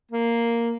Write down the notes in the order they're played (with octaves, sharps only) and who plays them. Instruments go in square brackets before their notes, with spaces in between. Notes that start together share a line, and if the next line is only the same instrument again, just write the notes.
[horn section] A#3